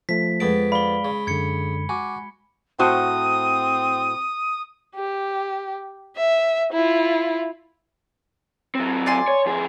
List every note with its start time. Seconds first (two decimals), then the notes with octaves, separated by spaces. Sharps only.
0.09 F3 A3 B6
0.40 F2 G#3 B3 G#4 A5 D7
0.72 D5 F5 B5 G7
1.05 C#3
1.27 F#2 D3 G#6 C#7
1.89 F#4 G#5 D6
2.79 A2 C4 F#4 C5 D#6
4.95 G4
6.16 E5
6.73 E4 F4
8.75 F#3 C4
9.06 D5 G#5 C6
9.28 C#5
9.46 F2 G#4